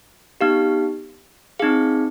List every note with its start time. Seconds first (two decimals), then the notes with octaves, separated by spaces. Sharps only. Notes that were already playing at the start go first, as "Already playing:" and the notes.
0.41 B3 D#4 G4 F5
1.59 C4 D#4 G#4 F5